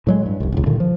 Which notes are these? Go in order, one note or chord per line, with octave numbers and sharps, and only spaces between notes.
A2 F#3 G#3
G2
F1 C2
E1 C#2
G2 A#2 D3 D#3
F3